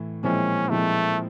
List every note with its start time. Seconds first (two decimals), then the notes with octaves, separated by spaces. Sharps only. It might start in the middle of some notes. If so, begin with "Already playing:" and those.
Already playing: A2 E3
0.23 A#2 F3 G#3 C4 C#4 E4
0.69 A#2 F3 G#3 A3 C4 E4